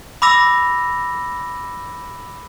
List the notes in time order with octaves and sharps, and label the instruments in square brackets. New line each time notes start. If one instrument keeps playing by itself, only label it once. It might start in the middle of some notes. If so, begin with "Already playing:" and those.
[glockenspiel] B5 D6 E6 A#6 F7